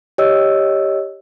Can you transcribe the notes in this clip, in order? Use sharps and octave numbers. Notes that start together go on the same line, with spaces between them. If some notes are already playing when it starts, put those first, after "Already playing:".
G4 C#5 D#5 E6